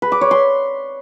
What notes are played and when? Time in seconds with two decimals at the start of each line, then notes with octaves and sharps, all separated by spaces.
0.02 B4
0.12 D6
0.21 C#5
0.31 C6